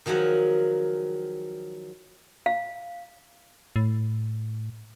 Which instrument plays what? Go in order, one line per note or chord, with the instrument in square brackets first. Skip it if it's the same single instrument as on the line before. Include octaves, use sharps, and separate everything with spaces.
[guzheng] D#3 F3 F#3 G#3 F#5
[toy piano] F5
[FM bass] A2